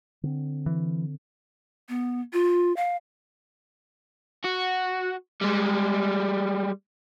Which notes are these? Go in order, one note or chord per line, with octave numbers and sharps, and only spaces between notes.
D3 C4
E3
B3
F4
F5
F#4
G3 G#3